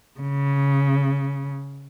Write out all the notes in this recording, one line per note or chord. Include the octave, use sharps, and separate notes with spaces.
C#3